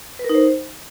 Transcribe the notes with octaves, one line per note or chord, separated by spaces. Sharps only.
B4
A#4
D#4
C5